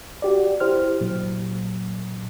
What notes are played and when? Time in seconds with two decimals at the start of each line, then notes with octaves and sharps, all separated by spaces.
0.22 F#4 G4 D5
0.60 E4 G4 C5 F6
1.01 A#2 F#3